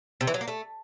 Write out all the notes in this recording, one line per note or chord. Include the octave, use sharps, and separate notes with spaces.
C3
E3
F#3
A#3
A3